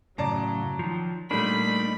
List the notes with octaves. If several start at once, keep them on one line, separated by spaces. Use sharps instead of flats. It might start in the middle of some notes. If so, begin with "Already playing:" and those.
F#2 A2 C#3 F#3 D5 A5 A#5
D#3 F3
A#2 G3 A3 D4 D#4 B5